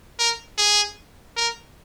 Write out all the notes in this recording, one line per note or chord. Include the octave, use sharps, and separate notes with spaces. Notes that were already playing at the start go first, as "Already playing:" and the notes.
A#4
G#4
A#4